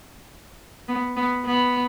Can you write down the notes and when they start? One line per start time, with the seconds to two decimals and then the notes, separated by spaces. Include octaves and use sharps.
0.88 B3
1.16 B3
1.45 B3